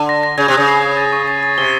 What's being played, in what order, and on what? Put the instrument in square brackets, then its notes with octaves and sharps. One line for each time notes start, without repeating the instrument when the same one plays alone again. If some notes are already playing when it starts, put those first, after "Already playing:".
Already playing: [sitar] D3
[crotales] A#6
A#6
[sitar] C#3 [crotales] G#6
[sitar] C3
[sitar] C#3 [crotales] D#6
[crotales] C7
G#6
A6
C#6
A6
A6
[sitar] C3 [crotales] G7